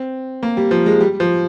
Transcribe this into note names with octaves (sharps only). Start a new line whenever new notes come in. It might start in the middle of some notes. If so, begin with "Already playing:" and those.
Already playing: C4
A#3
G3
F3
G#3
G3
F3